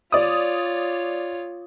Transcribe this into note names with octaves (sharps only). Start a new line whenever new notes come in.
F4 C#5 D5 D#6